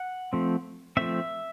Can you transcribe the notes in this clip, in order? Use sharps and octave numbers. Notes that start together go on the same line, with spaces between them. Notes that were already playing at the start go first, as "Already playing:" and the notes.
Already playing: F#5
F3 A3 C4
F3 A3 C4 E5